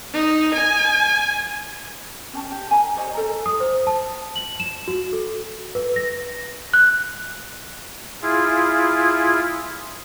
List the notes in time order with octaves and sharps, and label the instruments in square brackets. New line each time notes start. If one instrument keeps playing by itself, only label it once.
[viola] D#4
G#5
[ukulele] C#4 G5 A5
G4
G#5 A#5
G4 C5 C#5 D#5
A4 A#5
[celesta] D#6
C5
A5
F#7
E7
F#4
A4
B4
A#6
F#6
[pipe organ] E4 F4 G#4